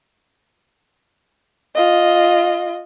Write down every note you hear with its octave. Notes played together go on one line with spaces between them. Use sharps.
F4 D#5